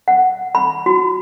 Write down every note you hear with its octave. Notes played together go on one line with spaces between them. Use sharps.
F#5
B5
F#4